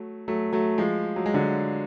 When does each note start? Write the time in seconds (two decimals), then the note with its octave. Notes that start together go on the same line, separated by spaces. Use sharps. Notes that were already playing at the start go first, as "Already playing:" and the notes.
Already playing: F#3 A3
0.28 F#3 A3
0.53 F#3 A3
0.78 F3 G#3
1.16 F#3
1.26 G#3
1.34 D3 F#3